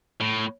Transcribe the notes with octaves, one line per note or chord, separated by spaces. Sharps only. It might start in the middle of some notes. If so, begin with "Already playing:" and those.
A2